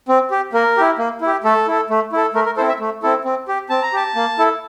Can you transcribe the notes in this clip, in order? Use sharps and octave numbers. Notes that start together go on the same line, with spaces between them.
C4
G4
A#3 A#4
E4 G4
A#3
E4 G4
A3 A4
E4 A4
A3
E4 A4
A3 A#4
A#4
C4 E4 A4 C5
E5
A3
C4 E4 A4
C4
G4
C4 A5
A#5
G4 A5
A#3
E4 A4